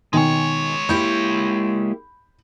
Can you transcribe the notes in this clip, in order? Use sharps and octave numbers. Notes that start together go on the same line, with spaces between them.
B2 D#3 G#3 C#5 G#5
A#3 E4 G4 B5 G6